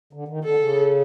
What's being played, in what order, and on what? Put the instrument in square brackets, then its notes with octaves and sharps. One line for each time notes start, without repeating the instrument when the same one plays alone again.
[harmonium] D3
D#3
[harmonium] D3 [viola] A4
[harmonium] C#3